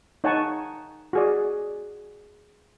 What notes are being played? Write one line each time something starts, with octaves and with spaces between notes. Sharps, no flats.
D#4 C#5 F#5 G#5 A5 C#6
F#4 G#4 D5